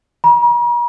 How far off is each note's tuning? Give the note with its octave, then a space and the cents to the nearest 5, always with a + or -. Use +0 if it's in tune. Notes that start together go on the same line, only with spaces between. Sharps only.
A#5 +45